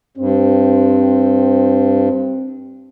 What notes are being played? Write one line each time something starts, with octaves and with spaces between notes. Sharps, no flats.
G2 C4